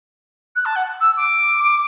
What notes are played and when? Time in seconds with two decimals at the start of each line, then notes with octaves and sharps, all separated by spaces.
0.56 F#6
0.65 A5
0.76 F#5
1.00 E6
1.17 D6